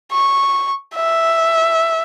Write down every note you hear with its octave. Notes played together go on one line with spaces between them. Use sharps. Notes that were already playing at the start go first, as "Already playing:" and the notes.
C#6
E5